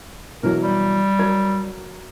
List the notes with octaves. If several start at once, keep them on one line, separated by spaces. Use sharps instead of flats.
B2 E3 F#3 A#4
G3
F#3 A#4 G#6